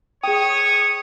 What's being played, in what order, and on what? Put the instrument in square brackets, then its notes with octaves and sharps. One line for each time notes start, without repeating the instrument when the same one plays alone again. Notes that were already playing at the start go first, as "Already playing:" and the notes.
[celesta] G#4 G5 [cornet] C#5 [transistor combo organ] D#6